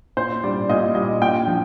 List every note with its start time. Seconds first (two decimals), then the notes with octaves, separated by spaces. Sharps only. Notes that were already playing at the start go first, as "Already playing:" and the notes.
0.17 A#2 C5
0.44 G3 D5
0.69 A#2 D#5
0.95 G3 D#5
1.22 A#2 G5
1.47 F3